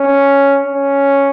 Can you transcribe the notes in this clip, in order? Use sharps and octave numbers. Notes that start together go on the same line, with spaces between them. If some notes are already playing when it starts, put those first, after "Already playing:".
Already playing: C#4
C#4